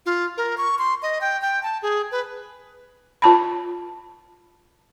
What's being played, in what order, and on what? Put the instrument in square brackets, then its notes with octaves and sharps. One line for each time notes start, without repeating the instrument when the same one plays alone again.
[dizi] F4
A#4
C#6
C6
D#5
G5
G5
A5
G#4
B4
[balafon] F4 A5 B5